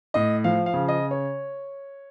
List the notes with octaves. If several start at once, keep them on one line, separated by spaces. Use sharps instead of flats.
A2 D#5
F3 F5
F5
C#3
D#5
C#5